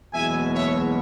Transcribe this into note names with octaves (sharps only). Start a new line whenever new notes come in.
F#1 E2 B2 G#3 E5 G#5
C#5 E5